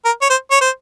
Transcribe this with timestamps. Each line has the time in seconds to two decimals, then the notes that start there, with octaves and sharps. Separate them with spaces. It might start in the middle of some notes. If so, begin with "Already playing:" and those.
0.05 A#4
0.22 C#5
0.30 C5
0.51 C#5
0.61 C5